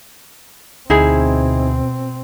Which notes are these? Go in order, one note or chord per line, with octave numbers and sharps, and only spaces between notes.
D2 B2 C4 D#4 E4 G#4